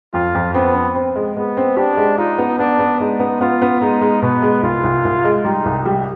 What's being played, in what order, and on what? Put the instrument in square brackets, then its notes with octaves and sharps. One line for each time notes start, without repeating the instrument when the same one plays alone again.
[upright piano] F2 [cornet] F4
[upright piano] F2
[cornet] B3 [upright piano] C4
[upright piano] C4
C4
G#3
[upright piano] G#3 [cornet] B3
[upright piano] C4
[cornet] D4 [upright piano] G4
[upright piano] G#3
[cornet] D#4 [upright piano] F4
[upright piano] B3
[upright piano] B3 [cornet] D4
[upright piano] B3
[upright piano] G#3 [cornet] D#4
[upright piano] B3
[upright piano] B3 [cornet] F4
[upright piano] B3
[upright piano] G#3 [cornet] D#4
[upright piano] G#3
[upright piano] B2 [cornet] B3
[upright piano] G#3
[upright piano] C2 [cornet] F4
[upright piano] C2
C2
G#3
[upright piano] G3 [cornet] D#4
[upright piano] C2
G3